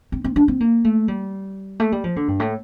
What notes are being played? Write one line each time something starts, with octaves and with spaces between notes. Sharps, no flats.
C4
C4
D4
C4
A#3
A3
G3
A3
G3
F3
D3
G2
A2